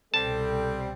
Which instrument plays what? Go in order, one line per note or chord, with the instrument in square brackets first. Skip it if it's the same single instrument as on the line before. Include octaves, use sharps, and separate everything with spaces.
[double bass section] C2 B2 [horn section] G3 C4 [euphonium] A4 [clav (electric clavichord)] A5